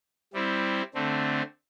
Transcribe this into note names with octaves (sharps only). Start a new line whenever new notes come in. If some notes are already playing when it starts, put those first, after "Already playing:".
G3 C4 E4
D3 A3 C4